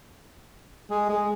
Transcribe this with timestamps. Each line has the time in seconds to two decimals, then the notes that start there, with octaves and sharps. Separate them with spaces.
0.90 G#3
1.09 G#3